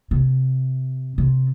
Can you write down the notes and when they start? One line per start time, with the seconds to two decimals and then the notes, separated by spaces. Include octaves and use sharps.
0.11 C3
1.18 C3